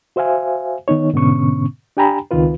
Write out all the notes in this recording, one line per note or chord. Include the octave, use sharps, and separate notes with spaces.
F#4 C5 E5 F5 G#5
D#3 B3 D#4 C#5
G#2 B2 D3 B3 C#4 C#6
D4 G4 G5 G#5 A#5 B5
C#2 D#3 C4 F4 B4